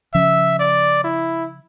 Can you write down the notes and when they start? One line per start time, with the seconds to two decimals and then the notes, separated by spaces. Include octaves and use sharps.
0.14 C#3 F3 C#4 E5
0.59 D5
1.04 E4